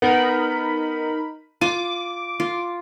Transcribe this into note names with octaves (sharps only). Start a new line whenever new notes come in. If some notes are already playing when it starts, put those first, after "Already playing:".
B3 D#4 A#4 B5
F4 D6 D#7
F4